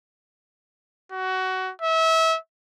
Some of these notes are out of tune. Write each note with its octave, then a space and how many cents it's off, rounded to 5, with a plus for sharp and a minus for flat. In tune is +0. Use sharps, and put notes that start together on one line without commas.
F#4 +20
E5 -30